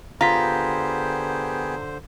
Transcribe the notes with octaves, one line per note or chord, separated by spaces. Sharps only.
D3 B3 F4 G4 G#4 C5 A#5 B6